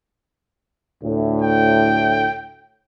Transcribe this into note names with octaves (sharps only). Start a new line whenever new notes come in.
D2 A2
G5